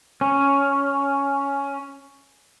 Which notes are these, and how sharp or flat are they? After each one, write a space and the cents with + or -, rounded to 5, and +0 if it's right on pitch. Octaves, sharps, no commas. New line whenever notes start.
C#4 +5